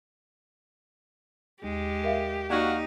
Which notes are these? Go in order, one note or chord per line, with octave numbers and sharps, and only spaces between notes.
D#2 G#3 G4
A#4 E5 F5
A#3 D#4 F#4 D5 F5 G#6